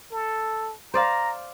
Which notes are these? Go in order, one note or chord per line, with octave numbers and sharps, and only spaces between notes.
A4
C5 D5 F5 A#5